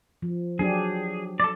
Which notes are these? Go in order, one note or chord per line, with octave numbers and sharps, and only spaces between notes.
F3
F#3 D4 G4 G#4
A4 D5